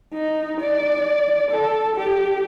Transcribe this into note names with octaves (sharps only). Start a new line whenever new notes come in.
D#4
D5
A4
G4